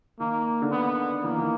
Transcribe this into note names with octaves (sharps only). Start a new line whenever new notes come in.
D#3 A#3
D3
D#3 B3
E3 A#3
D#3
E3